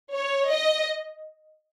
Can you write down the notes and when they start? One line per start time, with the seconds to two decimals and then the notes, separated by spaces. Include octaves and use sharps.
0.13 C#5
0.50 D#5